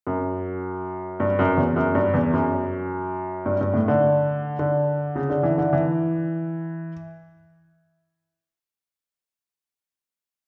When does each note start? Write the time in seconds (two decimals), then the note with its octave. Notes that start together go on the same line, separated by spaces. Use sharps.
0.07 F#2
1.20 G2
1.39 F#2
1.57 E2
1.76 F#2
1.95 G2
2.14 E2
2.33 F#2
3.46 G2
3.61 G2
3.74 A2
3.88 D3
4.59 D3
5.16 C#3
5.30 D3
5.43 E3
5.58 D3
5.73 E3